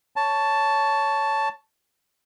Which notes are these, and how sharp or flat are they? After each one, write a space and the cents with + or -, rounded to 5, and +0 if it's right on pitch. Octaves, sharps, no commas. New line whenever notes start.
C#5 +10 A5 +0